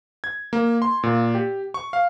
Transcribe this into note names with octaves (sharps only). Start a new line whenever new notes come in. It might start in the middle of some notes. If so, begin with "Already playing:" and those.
G#6
A#3
C6
A#2
G4
C#6
F5